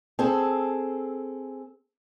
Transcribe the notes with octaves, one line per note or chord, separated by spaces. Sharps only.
C4 G#4 A4